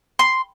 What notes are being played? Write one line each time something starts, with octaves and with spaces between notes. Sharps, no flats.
C6